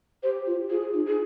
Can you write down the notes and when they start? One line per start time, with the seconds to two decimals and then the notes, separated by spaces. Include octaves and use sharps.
0.23 G4 C5
0.47 F4
0.70 F4 G#4
0.94 D#4
1.07 G#4